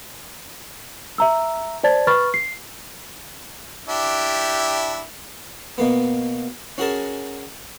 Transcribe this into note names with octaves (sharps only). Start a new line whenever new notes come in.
E5 A#5 E6
C5 D5 A5 G#6 A6
B4 B5 C#6 F6 A6
C7
D4 E4 G4
B2 A#3 B3
C#4 F#4 G#4 A#4 A5